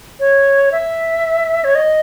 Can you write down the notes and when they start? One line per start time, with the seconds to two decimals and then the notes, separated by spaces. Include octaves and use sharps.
0.20 C#5
0.72 E5
1.64 C#5
1.75 D#5